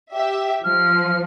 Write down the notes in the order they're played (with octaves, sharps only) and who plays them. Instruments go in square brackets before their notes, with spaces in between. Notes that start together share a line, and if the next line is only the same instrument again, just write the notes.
[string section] G4 E5
[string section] F3 [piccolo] F6